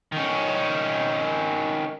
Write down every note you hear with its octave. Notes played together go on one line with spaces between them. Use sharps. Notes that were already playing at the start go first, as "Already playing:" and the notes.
D#3 C#4